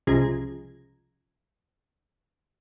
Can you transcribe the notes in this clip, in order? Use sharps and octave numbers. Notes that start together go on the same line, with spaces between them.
C2 C#3 F3 G#3 A#5 G#6